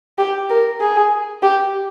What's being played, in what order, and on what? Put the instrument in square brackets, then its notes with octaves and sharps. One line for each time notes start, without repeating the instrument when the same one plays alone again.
[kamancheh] G4
A#4
G#4
G4